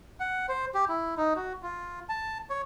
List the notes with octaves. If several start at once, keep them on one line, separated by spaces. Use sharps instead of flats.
F#5
C5
G4
E4
D#4
F#4
F4
A5
C#5